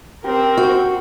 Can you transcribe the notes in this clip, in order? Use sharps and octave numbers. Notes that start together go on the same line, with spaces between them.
C4 G4 A#4
F#4